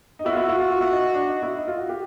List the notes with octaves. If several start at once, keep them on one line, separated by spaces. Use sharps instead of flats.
D#4
E4 F#4
F4
E4
E4
F4
F4
E4
D#4
D4
D#4
E4
D#4
F4
F#4
G4